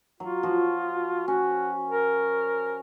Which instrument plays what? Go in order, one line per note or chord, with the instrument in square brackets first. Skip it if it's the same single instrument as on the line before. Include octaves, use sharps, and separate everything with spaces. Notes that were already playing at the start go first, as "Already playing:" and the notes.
[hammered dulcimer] F#3 [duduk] F4
[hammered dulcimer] F3 F#4
[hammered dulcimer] C#4 [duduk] F#4
[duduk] A#4